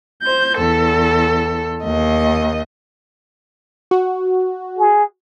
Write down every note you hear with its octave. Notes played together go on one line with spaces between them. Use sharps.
C5 G6
E2 A4
D#2 D#5
F#4
G#4